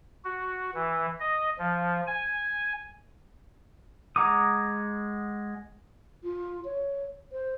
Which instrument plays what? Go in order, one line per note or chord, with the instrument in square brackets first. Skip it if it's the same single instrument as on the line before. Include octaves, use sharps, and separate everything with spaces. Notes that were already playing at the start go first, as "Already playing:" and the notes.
[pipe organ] F#4
E3
D#5
F3
G#5
[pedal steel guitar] G#3 F#5 A#5 D6 D#6
[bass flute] F4
C#5
C5